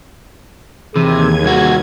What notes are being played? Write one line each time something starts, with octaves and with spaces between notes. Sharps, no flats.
D#2 C3 E3 G#4 G#6 D#7
C2 F#4